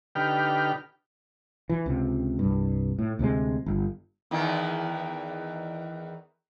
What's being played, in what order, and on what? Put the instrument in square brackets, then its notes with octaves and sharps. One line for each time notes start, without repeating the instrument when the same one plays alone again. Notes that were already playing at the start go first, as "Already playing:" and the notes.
[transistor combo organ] D3 D#4 G4 B4 G5 F6
[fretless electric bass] E3
C#2 C3
C2 G2
A2
D2 C3 E3 G#3
G1
[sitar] E2 D#3 E3